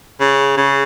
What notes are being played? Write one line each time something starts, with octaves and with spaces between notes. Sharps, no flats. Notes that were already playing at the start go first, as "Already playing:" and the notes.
C#3
C#3